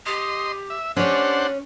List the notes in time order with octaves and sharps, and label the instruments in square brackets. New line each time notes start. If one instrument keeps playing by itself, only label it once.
[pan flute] G4 [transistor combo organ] D#5 C6
[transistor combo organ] E5
[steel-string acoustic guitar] C#4 C#5 [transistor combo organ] D4 C5 F#5 [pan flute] G4